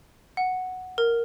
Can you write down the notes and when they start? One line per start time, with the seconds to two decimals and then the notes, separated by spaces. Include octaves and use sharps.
0.37 F#5
0.98 A#4